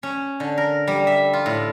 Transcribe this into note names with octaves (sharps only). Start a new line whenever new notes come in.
C#4
D3
A#4
G3
E5
F4
A2